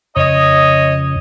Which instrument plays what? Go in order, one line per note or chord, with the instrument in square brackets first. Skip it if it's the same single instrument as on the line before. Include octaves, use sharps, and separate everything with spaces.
[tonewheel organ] F2 C#3 [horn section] C#5 D#5